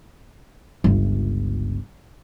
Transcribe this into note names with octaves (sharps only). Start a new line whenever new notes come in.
G1 C#2